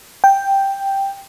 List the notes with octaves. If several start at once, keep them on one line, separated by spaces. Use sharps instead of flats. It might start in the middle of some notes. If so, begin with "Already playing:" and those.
G5